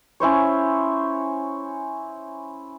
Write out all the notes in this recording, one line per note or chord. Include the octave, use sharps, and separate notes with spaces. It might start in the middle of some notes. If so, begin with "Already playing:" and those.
C#4 E4 C5 C#5